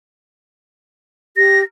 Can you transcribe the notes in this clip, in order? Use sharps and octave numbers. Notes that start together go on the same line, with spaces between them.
G4 A#6